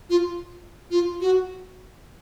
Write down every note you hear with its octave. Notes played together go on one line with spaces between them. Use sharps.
F4
F4
F#4